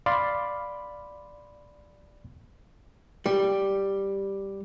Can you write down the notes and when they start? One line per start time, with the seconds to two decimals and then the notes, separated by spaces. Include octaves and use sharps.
0.06 D5 F5 B5 C6
3.26 G3